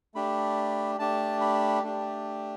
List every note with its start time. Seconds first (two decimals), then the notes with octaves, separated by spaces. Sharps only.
0.14 A3 D4 G4 B5
0.99 A3 D4 G4 A5
1.41 B5
1.83 A3 D4 G4